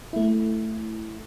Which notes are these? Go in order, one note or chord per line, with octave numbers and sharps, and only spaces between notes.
A3 E4